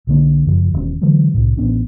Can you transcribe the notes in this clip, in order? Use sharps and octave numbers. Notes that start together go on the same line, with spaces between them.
B1 D3 A#3
F#2 C#3 F3
E1 D#3 B3 C#4
D3 E3 F#3 G#3
C2 A2
A1 B3 C#4 D4